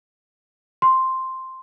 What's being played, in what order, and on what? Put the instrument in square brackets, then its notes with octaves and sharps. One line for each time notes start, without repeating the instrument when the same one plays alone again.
[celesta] C6